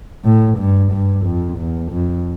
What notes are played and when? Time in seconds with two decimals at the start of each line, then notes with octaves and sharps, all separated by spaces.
0.25 A2
0.59 G2
0.93 G2
1.26 F2
1.59 E2
1.92 F2